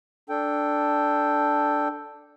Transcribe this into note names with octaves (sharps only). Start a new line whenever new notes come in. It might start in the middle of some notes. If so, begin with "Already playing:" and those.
D4 A4 G5